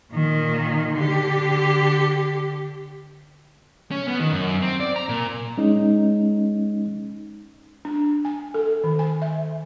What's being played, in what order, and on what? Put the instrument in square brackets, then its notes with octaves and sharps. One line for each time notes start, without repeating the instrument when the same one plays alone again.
[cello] A#2 D#3
D3 G4
[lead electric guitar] C#4
B3
D#3
F#2
C4
D5
A#5
A#2
[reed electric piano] G#3 C#4 D#4
[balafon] D4
G#5
A4
D#3
G#5
E5